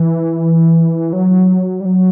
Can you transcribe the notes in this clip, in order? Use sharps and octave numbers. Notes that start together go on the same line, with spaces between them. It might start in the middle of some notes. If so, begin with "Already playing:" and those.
Already playing: E3
F#3
G3
F#3